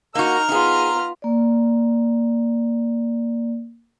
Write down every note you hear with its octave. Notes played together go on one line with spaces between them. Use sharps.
A#3 D#4 F#4 A#4 A#5 F6
B3 D#4 F4 G#4
A#3 D5